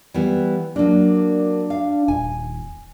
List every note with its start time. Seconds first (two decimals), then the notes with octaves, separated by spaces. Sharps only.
0.14 E3 G3 B3
0.76 F#3 A#3 D4
1.70 F5
2.08 D#1 G#5